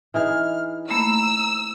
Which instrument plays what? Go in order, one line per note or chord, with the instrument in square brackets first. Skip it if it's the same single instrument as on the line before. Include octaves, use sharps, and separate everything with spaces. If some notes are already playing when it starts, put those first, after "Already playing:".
[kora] E3 D#4 G#4 [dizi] F6
[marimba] A3 A#3 B5 [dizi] A#5 [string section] E6